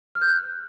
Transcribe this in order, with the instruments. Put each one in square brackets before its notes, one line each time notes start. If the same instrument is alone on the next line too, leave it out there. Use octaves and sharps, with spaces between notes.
[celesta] F6
G6
F#6